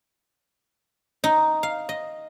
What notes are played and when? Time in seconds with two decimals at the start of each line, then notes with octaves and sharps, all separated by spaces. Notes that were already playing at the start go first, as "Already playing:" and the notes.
1.24 D#4
1.63 F5
1.89 D#5